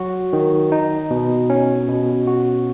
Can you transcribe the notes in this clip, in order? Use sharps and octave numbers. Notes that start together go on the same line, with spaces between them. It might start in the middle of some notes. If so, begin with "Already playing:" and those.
Already playing: F#3 F#4
D#3
D#4
B2
C#4
B2
F#4